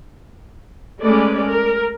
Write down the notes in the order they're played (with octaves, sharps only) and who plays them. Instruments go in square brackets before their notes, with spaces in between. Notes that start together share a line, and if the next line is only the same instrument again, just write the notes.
[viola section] G#3 A3 C#4 B4 D5
A#4